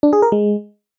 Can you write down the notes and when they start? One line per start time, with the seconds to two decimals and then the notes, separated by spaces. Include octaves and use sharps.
0.03 D4
0.13 G#4
0.22 A#4
0.32 G#3